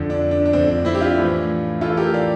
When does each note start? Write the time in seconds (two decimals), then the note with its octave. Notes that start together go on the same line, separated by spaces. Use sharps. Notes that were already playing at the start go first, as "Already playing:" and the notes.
Already playing: F2 D3
0.10 D4
0.31 D4
0.46 D4
0.53 F2 D3 C4
0.69 D4
0.85 C4 E4
0.95 G4
1.01 D4 F4
1.18 A2 E3
1.81 A2 E3 F4 A4
1.97 G4 A#4
2.14 D5 F5